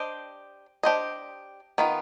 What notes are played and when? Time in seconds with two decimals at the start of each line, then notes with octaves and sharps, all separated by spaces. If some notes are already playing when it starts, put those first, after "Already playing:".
Already playing: D4 G4 C5 D#5
0.83 D4 G4 C5 D#5
1.78 D#3 B3 F4